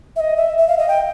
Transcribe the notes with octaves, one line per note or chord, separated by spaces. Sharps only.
E5
D#5
E5
E5
F5
D#5
G5